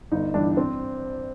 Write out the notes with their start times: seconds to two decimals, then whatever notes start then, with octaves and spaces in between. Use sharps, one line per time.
0.12 G1 D#4
0.34 G2 E3 D4
0.57 C4